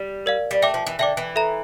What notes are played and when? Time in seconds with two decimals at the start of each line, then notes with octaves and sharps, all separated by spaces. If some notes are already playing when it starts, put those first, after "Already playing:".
Already playing: G3
0.26 A#4 D5 F5
0.51 G3
0.62 A3 E5 G5 D6
0.74 F3
0.87 E3
0.99 D3 E5 G5 D6
1.17 E3
1.36 A4 E5 A#5